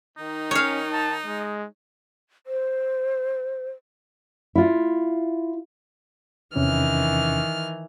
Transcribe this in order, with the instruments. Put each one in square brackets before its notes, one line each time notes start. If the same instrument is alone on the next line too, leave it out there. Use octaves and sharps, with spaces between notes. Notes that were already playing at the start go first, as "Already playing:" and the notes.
[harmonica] D#3 [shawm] D#4
[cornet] C#4 [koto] C#5 F5
[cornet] A5
G#3
[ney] C5
[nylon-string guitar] E4 F4
[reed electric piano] E2 C3 C#4 [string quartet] D#3 E3 F6